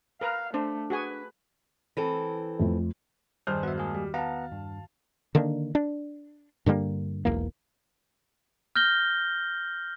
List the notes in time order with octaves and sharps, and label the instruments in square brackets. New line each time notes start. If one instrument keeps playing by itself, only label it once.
[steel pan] A#4 B4 A#5 [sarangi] F5
[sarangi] A3 [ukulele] D4 [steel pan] C5
[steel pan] F#4 G#4 G#5 [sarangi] B4
[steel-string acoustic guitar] E3 C4 A4
[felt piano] F2 A3
[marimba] E2 D#3 D#5 [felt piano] G2 C5 F6 [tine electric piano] G#4
[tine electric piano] B3 E5 [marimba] F#4
[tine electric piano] G#3 A#3 G#4
[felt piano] G3
[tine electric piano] B3 F#5 A#5 [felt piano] F5 A5
[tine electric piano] G2
[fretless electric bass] D3 D#3 A#3 D4
D4
G2 D3 G3 A#3
E1 B1 E2 A#3
[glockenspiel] F6 G6 A#6 G7